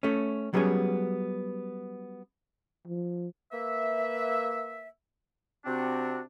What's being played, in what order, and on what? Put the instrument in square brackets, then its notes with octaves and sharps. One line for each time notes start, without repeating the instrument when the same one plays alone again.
[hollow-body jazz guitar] A3 C#4
F#3 G3 B3 C#4 G#4
[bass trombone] F3
[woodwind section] A#3 B4 E5
C3 C4 D4 F#4